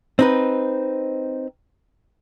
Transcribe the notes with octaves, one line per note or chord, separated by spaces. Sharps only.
C4 D#4 B4